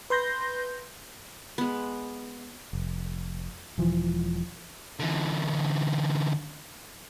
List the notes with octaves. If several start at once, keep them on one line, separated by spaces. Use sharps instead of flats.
B4 C6 G6 A#6
G#3 B3
F1
E1 E3 F3
D3 E3